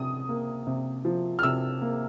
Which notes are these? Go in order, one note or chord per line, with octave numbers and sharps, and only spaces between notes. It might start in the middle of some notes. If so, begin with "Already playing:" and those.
Already playing: C3 D#6
A#3
C3
F3
F6
C3 E6
A#3